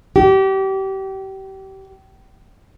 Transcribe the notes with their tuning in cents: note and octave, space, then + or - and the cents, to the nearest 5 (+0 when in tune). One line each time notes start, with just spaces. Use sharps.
G4 -30